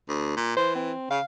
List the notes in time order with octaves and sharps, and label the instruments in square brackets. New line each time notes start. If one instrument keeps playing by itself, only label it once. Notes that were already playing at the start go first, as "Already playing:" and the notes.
[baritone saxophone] D2
A#2
[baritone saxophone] E3 [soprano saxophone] C5
[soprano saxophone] C4
[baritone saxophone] C#3 [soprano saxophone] F5